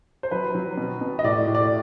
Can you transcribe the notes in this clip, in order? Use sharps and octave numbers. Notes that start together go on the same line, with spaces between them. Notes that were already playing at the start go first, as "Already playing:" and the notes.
C5
F#3 B4
F#3
B2
B2
D#5
A2 D5
A2
D5